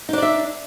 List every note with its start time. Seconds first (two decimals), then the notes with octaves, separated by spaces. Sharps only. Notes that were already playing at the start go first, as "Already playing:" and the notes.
0.09 D#4
0.13 D4
0.18 D5
0.22 E5